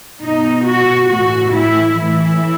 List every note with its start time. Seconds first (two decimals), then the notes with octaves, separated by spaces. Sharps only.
0.22 B2 D#4
0.66 F#4
1.09 A2 E3 F#4
1.53 E4
1.97 A2 E3 E4